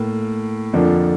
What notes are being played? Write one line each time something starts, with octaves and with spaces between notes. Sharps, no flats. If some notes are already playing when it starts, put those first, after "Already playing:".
Already playing: A2 A#3
F2 D3 F3 A#3 D4